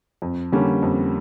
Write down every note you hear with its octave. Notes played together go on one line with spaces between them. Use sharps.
F2
D3 G3 A#3 C#4
F2